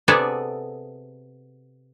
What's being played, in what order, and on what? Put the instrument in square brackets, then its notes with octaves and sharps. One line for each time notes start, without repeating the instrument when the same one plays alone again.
[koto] C3 B3 G#4 A4 D5